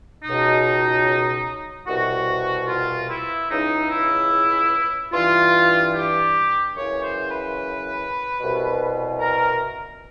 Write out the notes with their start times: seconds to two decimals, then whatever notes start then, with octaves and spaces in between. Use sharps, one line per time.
0.24 C#2 B2 D#4
1.87 C2 B2 F#4
2.68 F4
3.09 E4
3.50 C#2 C#3 E3 D#4
3.90 E4
5.13 G2 E3 F4
5.95 G4
6.76 F#2 C#3 E3 C#5
7.04 C5
7.31 B4
8.39 C2 B2
9.20 A#4